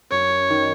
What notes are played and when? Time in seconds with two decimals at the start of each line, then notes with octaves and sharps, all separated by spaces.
0.11 F#2 C#5
0.50 D#3